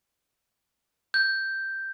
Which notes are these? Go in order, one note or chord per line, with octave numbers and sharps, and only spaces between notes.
G6